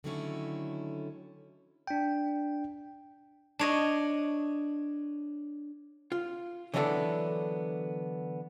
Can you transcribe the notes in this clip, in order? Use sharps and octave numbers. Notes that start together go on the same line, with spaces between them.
D3 D#3 F#3 A3 C#4 E4
D4 G5
D4 C#5 D#5
F4
D3 E3 F#3 B3 D4 A4